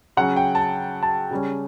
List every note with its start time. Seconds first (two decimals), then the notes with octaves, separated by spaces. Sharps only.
0.17 C#3 F#3 C#4 F#5
0.36 G5
0.55 A5
1.03 A5
1.31 C#3 G3 C#4